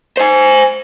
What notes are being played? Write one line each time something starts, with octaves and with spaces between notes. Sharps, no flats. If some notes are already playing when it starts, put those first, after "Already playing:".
C5 G#5